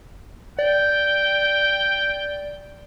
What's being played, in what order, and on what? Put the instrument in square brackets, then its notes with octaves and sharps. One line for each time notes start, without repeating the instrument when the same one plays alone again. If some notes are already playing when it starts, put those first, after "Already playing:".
[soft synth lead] D5 [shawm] G5